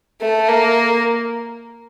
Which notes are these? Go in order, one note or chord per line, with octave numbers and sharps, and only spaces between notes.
A3
A#3